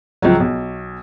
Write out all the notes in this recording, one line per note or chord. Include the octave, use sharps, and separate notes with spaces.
C#2 F3 F#3
B1